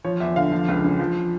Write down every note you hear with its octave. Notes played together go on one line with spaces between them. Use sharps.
F3 C#5
E2 E5
D3 F5
F3
C#2
C#3
F3